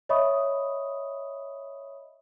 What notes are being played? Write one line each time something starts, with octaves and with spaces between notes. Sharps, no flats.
C#5 D#5 E5 B5 C#6 D#6